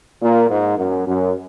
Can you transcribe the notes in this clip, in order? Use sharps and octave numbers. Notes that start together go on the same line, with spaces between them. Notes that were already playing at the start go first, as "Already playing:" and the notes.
A#2
G#2
F#2
F#2